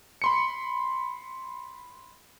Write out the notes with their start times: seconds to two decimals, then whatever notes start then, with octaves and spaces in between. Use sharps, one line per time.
0.22 B5 C6 C#7